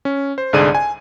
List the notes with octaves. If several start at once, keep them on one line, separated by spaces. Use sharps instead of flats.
C#4
C5
C2 G#2 D3 G#4 D5 D#7
G#5